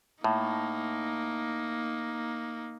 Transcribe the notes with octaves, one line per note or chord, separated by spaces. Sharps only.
A2 A#3 D#4